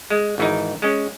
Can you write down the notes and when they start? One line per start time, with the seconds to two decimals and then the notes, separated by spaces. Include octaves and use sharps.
0.10 G#3
0.38 G#1 E3 D#4
0.82 G#3 C#4